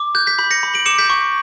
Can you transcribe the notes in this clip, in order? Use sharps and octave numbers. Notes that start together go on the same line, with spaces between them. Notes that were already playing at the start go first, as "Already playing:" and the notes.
Already playing: D6
F#6 G6
G6 B6
B5 G6 B6
A#6 C#7
B5
D7 F#7
D6 C#7 E7
G6 B6
C#6